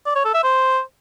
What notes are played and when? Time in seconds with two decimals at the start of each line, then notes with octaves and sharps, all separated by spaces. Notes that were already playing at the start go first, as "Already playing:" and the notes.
0.06 D5
0.15 C#5
0.25 A4
0.34 E5
0.43 C5